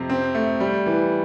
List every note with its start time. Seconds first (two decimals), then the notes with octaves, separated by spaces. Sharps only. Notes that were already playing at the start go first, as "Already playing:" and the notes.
Already playing: F2 C3
0.10 C4
0.35 A3
0.60 G3
0.86 E3